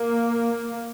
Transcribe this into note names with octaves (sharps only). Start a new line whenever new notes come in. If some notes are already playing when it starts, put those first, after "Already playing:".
Already playing: A#3